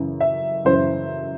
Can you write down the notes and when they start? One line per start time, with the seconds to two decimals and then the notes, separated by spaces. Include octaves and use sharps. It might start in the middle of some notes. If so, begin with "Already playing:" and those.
Already playing: F#2 C#3 E3
0.20 E5
0.65 F#2 C#3 E3 C5